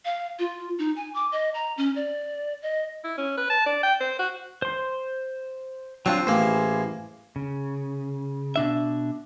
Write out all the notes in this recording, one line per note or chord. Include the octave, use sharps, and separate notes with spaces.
F5
F4
D#4
G#5
D6
D#5
A#5
C#4
D5
D#5
E4
C#4
B4
A5
D5
G5
C5
F#4
C5 C6
F#3 C4 D4 F4 C#6
A1 A#3 E4 G#4 C5
C#3
B2 D4 E5